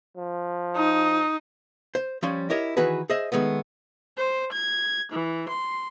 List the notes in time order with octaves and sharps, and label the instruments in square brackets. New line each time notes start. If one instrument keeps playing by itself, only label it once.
[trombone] F3
[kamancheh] D#4 [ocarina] D#6
[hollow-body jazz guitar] C5
F3 G3 C#4 C#5 C6
E4 G4 A#4 C#5 D#5
D#3 E3 F#4 G#4 B4
G#4 C5 D#5 E5
D#3 G#3 A3 B3
[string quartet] C5
G#6
E3
C6